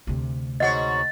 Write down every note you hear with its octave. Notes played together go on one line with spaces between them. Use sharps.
D2 C3
G#2 F#4 C#5 D#5 F#5 A6